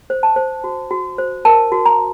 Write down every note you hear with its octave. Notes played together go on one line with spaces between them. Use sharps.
C5
A5
C5
F#4
F#4
C5
A#4 A5
F#4
A#5